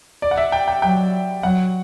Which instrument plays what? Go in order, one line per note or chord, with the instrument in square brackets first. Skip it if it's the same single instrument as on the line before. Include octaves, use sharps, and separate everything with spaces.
[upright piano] D5
F#5
E5
G5
G5
[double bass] F#3 [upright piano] G5
[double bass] F#3 [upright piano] F#5